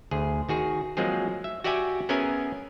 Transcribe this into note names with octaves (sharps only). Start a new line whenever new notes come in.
D2 G#4
D#3 F#4 G#4
F3 F#3 G#3 A#3 C4 G#4
E5
F#4 G4 D5 E5 G5 G#5
B3 C#4 G#4 A#4 E5 G#5